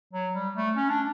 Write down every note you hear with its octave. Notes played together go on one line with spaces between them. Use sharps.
F#3
G3
A3
C#4
D4